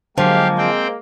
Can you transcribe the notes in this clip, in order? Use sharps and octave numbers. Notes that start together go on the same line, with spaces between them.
D3 F3 F#3 G#3 A#3 F#4 G4 F5
C4 G5